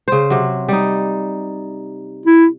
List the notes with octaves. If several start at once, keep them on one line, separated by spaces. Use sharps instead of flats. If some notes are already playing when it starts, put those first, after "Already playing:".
C#3 C5
C3 F#3
G3 D#4
E4